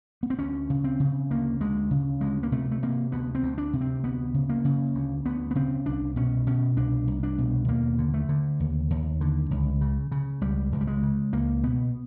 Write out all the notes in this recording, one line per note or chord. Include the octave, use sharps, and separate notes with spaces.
B3
C4
D2 C#4
C#3
C4
C#3
D2 A#3
D2 G#3
C#3
D2 G#3
A#3
C3 A3
A3
C3 A#3
D2 B3
C4
D2
D4
C3
C4
D2 B3
C#3
A#3
C#3
D2
D2 B3
B3
C#3 C4
C2 D4
B2 C#4
B2 C#4
C2 D4
C2
D4
B2
D#2 A#3
D3
A3
D3
D#2
D#2
D3
C#2
C#3
C#3
C#2 G3
C#2
G3
G#3
C#3
C#2 A#3
B2 B3